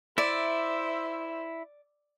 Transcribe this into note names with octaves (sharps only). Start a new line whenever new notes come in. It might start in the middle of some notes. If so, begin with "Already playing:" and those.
E4 C5 D5 E5